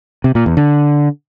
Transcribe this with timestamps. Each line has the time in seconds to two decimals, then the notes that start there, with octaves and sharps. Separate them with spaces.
0.24 C3
0.35 A#2
0.46 E2
0.57 D3